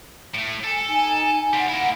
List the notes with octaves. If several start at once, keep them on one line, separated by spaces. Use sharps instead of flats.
A2 A3
A4 G#5
D#4 G#5
G3 C4 F#5
A#3 E4